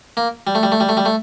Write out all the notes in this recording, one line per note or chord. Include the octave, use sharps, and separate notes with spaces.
A#3
G3
A3
G3
A3
G3
A3
G3
A3